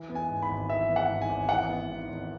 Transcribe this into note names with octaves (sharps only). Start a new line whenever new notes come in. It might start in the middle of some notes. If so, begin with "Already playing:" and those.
Already playing: E3
B3
G#5
G#2
B5
G#1
E3 E5
B3
F#5
G#2
G#5
G#1
E3 F#5
B3
G#2
G#1